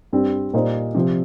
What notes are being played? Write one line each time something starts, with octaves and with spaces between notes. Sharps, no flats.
G2 G3 C4
A#2 G3 D#4 C5
C3 F3 C4